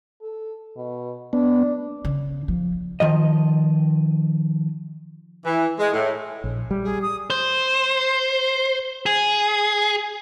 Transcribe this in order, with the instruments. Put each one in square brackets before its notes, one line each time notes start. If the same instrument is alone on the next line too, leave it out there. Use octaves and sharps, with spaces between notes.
[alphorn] A4
B2
[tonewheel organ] B3 [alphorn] D4
[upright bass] C#3
F3
[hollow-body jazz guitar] D#3 F3 D#5
[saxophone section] E3
G#3
A2
[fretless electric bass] A#1
G3
[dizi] G#4
D#6
[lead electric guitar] C5
G#4